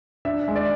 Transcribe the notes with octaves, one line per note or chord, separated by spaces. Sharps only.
D4 E5
G#3
D5